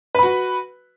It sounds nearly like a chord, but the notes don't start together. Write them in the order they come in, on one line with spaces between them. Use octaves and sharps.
B4 B5 F#4